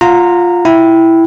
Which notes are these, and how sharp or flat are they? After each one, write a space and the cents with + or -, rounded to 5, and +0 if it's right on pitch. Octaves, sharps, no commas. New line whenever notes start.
F4 +5 F#5 -15 A#5 -15
E4 +0 G5 -5